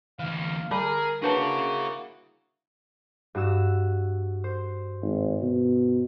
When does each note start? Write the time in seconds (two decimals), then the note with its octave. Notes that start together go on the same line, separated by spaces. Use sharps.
0.19 D2 E3 F5
0.71 D3 G3 G#4 A#4 B5
1.22 A#3 D4 E4 F#4 G#4 B4 C#5 A5
3.35 G2 F#4 E6
4.44 C5
5.02 G#1
5.42 B2